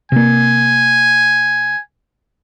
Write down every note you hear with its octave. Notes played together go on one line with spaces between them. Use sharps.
C3 A#3 G#5